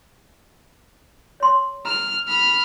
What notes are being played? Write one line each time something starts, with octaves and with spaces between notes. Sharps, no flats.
C#5 C6
A#5 F6
B5 F6